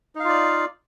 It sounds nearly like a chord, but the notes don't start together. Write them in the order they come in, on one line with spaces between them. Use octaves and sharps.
D#4 F5 F4 D5